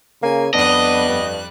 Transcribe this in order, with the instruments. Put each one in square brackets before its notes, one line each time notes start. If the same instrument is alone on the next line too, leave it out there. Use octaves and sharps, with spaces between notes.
[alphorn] C#3 [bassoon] A#3 [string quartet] G#5
[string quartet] F2 G3 F#6 [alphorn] B3 [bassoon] D4 [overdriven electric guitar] D#5
[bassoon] G2